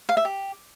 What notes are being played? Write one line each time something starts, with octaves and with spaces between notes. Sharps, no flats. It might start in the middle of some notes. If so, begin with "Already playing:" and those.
F5
E5
G4